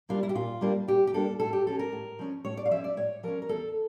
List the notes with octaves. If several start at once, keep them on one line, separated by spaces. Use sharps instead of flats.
G3 A#3 D4 F4
E4
G4
A#2 F4
G3 A#3 D4
A#2 G4
G4
G3 A#3 D4 A4
A2 A4
G4
F3 C#4 A4
A#4
A2
F3 C#4
A2 C#5
D5
F5
F3 C#4 E5
D5
A2 C#5
F3 C#4 A#4
A#4
E2 A4